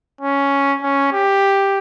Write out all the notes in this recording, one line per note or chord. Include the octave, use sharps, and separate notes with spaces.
C#4
C#4
G4